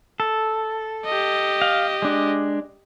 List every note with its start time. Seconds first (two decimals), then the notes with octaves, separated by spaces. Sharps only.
0.20 A4
1.05 G4 D#5
1.62 F5
2.02 G#3 D4